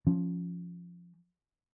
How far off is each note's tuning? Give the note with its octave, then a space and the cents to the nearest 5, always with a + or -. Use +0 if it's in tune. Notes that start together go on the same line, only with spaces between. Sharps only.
F3 +0 C#4 +0